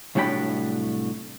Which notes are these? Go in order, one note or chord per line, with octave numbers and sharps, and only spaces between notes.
C2 A2 F#3 D4 G5 B5